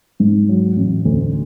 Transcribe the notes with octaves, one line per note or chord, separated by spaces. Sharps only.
G#2
F#3
A1
D2